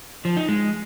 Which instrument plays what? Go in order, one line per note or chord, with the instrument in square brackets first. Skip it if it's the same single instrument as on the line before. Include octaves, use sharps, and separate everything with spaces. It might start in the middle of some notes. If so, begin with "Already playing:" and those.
[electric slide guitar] F3
D#4
G#3